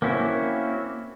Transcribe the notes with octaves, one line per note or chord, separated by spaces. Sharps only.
A#3 C4 C#4 E4 F#4